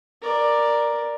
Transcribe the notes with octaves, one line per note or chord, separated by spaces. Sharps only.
A#4 D5